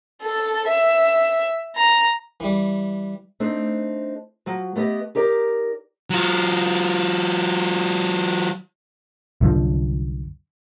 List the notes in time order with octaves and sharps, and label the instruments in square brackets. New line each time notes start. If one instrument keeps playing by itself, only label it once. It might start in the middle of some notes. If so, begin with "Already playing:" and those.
[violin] A4
E5
A#5
[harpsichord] E3 G3
[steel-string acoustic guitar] A3 C4 D4 D#4
F3 F#3
A3 B3 G4 D#5
D#4 G4 A#4 D5
[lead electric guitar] F#3 F4
[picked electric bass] C2 F#2 D3 F3